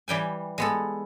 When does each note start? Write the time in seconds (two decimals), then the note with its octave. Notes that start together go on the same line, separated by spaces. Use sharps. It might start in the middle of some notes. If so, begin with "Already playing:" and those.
0.08 E3 G3 G5 G#5
0.58 G#3 B3 A4